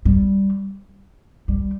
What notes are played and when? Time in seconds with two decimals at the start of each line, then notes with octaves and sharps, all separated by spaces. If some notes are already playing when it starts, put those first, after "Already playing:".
0.05 G3
1.48 G3